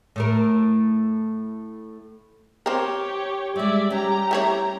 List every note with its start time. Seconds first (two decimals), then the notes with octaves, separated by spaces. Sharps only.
0.16 A2 A3 A#4
2.66 C4 G4 A#4 C#5
3.56 G3 G#3 D5 E5
3.90 G3 C#4 G4 A#5
4.31 A3 E4 C#5